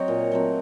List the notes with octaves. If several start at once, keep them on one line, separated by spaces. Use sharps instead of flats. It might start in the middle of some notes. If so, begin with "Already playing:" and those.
Already playing: F#3 C4 C#5 D#5
A#2
F#3 A3 C4